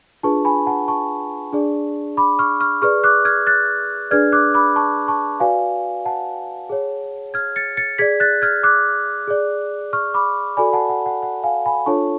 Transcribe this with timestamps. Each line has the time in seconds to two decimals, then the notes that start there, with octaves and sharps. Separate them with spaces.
0.23 D4 F4 G#4 B4 A5 C#6
0.45 G#5 B5
0.67 F#5 A5
0.88 A5 C#6
1.53 D4 G#4 D5
2.17 B5 D6
2.39 C#6 F6
2.60 C#6 F6
2.82 G#4 B4 D5 C#6 F6
3.04 D6 F#6
3.25 F6 G#6
3.47 F#6 A6
4.11 D4 G#4 B4 D5 F6 G#6
4.32 D6 F#6
4.54 B5 D6
4.76 A5 C#6
5.08 A5 C#6
5.40 F#4 B4 D5 F5 G#5
6.05 F#5 A5
6.70 G#4 C#5
7.34 F6 G#6
7.56 A6 C#7
7.77 A6 C#7
7.98 G#4 D5 G#6 B6
8.20 F#6 A6
8.42 F6 G#6
8.63 D6 F#6
9.28 G#4 D5
9.93 C#6 F6
10.14 B5 D6
10.57 F#4 A4 D5 G#5 B5
10.73 F#5 A5
10.89 F#5
11.06 F#5
11.23 F#5
11.43 F5 G#5
11.66 G#5 B5
11.86 D4 F4 A4 C#5 A5 C#6